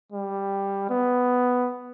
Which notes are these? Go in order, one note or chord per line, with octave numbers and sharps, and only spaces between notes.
G3
B3